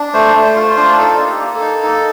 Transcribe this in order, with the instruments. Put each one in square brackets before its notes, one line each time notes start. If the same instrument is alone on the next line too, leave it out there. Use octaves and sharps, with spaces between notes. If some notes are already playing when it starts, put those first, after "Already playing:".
Already playing: [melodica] D4
A3 C5
A3
C5
F4
C5
D4
D#4 A4
A#3
G4
A#3
A4
D#4
D#4